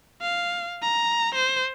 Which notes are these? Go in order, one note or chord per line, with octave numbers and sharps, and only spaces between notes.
F5
A#5
C5